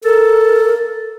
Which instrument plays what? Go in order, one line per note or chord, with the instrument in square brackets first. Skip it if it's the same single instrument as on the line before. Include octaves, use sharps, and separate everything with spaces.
[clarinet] A4 [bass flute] A#4